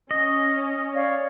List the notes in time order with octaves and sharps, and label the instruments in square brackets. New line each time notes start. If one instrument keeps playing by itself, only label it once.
[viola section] C#4 [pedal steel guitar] D#5
[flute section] C#5 D5 F5